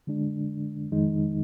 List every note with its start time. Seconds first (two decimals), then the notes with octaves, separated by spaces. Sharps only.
0.07 D3 G#3 D4
0.92 F2 D#3 G#3 D#4